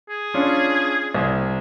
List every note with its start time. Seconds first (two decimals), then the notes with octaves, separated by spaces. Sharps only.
0.09 G#4
0.34 C#4 D4 F4
1.14 C2